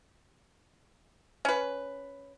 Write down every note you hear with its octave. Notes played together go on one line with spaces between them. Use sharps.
C#4 B4